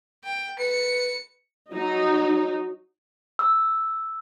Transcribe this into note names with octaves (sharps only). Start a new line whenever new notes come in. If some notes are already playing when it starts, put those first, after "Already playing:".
G5
B4 C#7
F#3 D#4
E6